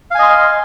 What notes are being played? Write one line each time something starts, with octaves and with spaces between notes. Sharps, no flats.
D#5 F5 G#5 C6